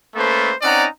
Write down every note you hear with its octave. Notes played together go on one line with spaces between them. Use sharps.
A3 A#3 C#4 A4 B4 C5
C4 C#4 D#4 D5 F#5 A#5